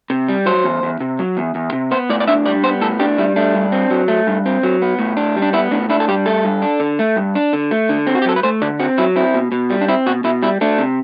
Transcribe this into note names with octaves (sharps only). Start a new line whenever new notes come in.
C3
G3
F#3 C5
E2
E2
C3
F#3
E2
E2
C3
B3 C5
A2 D5
D5
D4 E5
G3 D5
B3 C5
A2 A4
D4 G4
G3 E4
A3 D4
G2
C4
F#3
A3
G2
C4
F#3
B3
A2
D4
G3
D4
B3 E4
A2 D4
D4 E4
A4
G3 G4
A3 A4
G2
D4
D3
A3
G2
D4
D3
A3
D3
C4
F#4
G4
F#3 A4
B4
A3 C5
D3 D5
C4 F#4
F#3 E4
C4 E4
B2
B2
G3
D4
C4 E4
B2 F#4
B2 E4
G3 E4
A3 D4
C3